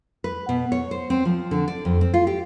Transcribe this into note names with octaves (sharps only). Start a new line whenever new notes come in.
B4
B2
C#5
C5
C4
F3
D3
D5
F2
C4
F4
G4